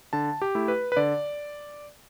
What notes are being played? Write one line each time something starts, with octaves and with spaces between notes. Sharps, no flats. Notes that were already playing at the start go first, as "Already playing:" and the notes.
D3 A5
G4
A3 E4
B4
B4
D3 D5